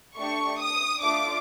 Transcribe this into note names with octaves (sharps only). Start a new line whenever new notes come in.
A3 D4 G4 C#6
D#6
A3 D4 F4 D6